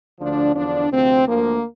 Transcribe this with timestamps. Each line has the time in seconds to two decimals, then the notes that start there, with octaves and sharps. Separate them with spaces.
0.19 D2 D3 F3 D4
0.54 E2 D3 F3 D4
0.91 D2 C3 F3 C4
1.26 D2 D3 F3 A#3